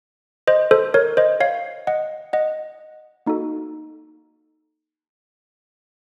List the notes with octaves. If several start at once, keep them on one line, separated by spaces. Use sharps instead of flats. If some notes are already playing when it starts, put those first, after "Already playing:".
C5 D#5
A4 C5
A#4 C#5
C5 D#5
C#5 F5
D#5 F#5
D#5 F#5
A#3 D#4 F#4 A4